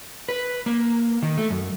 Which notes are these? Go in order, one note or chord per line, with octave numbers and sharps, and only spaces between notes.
B4
A#3
D#3
A3
F#2